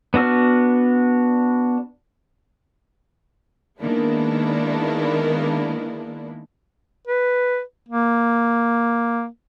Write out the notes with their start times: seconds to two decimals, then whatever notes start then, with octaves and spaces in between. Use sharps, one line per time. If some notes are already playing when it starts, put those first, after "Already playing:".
0.14 B3 D4 F#4 E6 F6
3.80 D#3 G#3 A#3 B3 D4 E4
7.07 B4
7.89 A#3